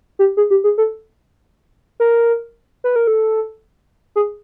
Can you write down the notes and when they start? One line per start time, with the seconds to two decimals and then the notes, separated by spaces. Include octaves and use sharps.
0.19 G4
0.37 G#4
0.50 G4
0.64 G#4
0.78 A4
2.00 A#4
2.84 B4
2.96 A#4
3.07 A4
4.16 G#4